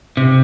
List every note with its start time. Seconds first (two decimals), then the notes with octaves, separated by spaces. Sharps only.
0.17 C3